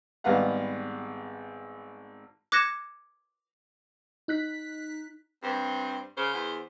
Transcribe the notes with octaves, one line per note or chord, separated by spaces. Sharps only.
G#1 G3 B3 B4 F5 F#5
D6 F#6 G#6 A#6 C#7 E7
D#4 F#6 B6
G2 C4
C#3 C5
E2